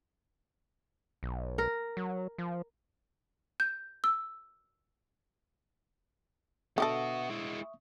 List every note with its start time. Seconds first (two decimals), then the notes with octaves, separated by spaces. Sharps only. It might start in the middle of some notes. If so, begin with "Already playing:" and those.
1.23 B1
1.58 A#4
1.97 F#3
2.38 F3
3.60 G6
4.04 E6
6.78 D3 B3 F#4 G4 A4 E5 C#6 D#6
7.30 G#3 E4